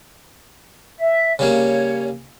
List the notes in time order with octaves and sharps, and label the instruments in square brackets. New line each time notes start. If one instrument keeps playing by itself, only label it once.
[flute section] E5
[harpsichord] C#3 G3 A#3 [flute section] C#5